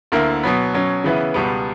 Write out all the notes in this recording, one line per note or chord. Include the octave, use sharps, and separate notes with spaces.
D2 D3 A#3 E4 A#4
B2 F#3 B3
B2 F#3 C#4
C#3 E3 B3 E4 B4
C#2 B2 G3 B3